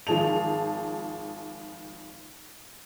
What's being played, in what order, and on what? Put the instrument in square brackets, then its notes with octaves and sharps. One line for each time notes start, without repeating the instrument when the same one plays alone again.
[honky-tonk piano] G#1 F3 G#4 A5 F7